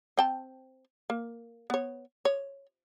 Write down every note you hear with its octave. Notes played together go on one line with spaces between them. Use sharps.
C4 G5 A5
A#3
B3 C#5
C#5